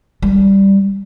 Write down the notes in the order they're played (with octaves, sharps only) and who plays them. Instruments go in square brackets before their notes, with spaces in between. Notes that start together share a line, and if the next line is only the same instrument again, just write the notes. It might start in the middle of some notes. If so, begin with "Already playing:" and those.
[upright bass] G3